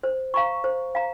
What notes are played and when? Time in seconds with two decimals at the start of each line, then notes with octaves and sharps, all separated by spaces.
0.03 C5
0.34 F5 A#5 C#6
0.64 C5
0.95 F5 A#5